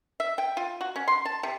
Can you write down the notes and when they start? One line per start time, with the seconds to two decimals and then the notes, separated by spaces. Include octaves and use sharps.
0.20 E5
0.38 G5
0.57 F4
0.81 F#4
0.96 C#4
1.08 C6
1.25 A5
1.43 C3